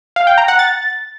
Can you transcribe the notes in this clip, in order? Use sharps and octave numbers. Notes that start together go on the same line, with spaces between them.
F5
G5
A#5
F#5
A6